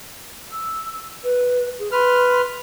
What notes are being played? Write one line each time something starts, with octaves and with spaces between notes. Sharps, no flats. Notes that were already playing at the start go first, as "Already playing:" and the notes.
E6
B4
G#4
B4 C6 F6